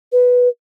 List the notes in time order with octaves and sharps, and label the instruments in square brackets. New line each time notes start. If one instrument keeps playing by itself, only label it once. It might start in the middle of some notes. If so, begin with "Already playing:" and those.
[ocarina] B4